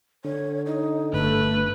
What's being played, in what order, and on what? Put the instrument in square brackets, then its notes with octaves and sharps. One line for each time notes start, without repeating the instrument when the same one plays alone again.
[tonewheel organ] D3 [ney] C#5
[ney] D#4
[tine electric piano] G1 [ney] A3 [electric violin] B4